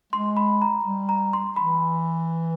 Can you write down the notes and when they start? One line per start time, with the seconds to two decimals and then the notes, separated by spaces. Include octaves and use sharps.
0.13 G#3 C6
0.37 B5
0.62 A#5
0.85 G3
1.09 A#5
1.33 C6
1.56 E3 B5